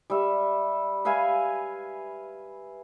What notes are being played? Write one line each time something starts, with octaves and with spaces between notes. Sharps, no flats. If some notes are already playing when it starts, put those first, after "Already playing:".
G3 E5
B4 E5 F5 G#5